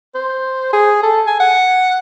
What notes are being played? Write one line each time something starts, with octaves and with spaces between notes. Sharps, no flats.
C5
G#4
A4
G#5
F#5